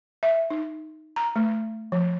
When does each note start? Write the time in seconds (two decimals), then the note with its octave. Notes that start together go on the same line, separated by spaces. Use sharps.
0.23 E5
0.50 D#4
1.16 A#5
1.36 A3
1.92 F3